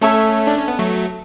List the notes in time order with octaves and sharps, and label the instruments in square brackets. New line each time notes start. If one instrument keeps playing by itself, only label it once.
[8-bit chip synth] A3 C#4 [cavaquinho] A4 C#5 E5
[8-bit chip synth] D4
C#4
B3
F#3 A3